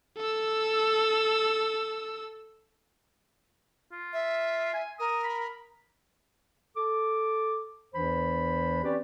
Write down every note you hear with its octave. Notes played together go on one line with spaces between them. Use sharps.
A4 E6
F4
E5
G#5
A#4 D#6
B5
A4 D6
E2 E3 D4 C5 B5
C4 C#4 G4 B4 D5